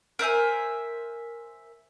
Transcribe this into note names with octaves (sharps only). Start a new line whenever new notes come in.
A#4 C5 E5 G#5